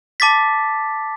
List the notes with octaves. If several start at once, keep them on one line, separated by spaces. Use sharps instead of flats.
A5 D6 A6 B6